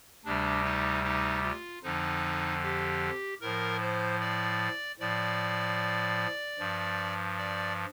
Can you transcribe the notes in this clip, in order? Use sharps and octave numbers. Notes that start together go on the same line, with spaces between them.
D2 C3 G3 D4
D#4
D#4
F4
F2 D3 F3 D#4
G4
A2 F3 A#4
C5
D5
A2 F3 D5
G2 F3
D5